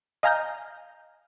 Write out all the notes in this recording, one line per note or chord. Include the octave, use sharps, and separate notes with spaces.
D#5 F5 G#5 A#5 F6 G6